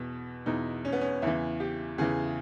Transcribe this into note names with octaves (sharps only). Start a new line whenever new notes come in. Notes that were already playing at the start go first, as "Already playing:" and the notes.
Already playing: E2 B2
E2 B2 D#4
C#4
B3
C#4
E2 C#3 E3 E4
G4
E2 C#3 E3 G#4